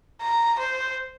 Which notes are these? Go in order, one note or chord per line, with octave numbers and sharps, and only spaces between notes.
A#5
C5